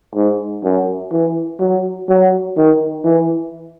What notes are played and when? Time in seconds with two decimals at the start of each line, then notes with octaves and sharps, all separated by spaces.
0.15 G#2
0.63 F#2
1.12 E3
1.60 F#3
2.08 F#3
2.57 D#3
3.04 E3